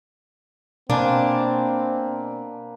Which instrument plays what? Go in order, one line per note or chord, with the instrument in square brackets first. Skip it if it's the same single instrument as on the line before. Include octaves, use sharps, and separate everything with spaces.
[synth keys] B2 D5 G#5 [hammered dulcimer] A#3 B4 C5 [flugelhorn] C4 [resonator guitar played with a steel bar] D4